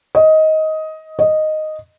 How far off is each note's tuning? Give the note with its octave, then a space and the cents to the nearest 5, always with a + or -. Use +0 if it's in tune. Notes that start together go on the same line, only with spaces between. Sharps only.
D#5 +15
D#5 -5